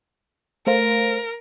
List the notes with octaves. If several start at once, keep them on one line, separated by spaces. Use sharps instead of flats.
A3 A#4 C5 F5